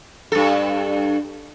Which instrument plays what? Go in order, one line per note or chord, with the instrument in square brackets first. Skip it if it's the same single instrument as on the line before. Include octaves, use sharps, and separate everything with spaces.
[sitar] G2 A4